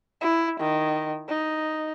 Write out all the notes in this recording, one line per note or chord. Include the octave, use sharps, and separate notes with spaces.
E4
D#3
D#4